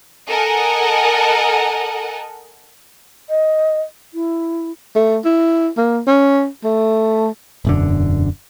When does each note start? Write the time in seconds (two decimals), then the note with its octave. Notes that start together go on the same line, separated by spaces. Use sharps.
0.29 A4 A#4 D#5 F#5 G#5
3.29 D#5
4.14 E4
4.95 A3
5.25 E4
5.77 A#3
6.07 C#4
6.64 A3
7.65 E1 F#2 D3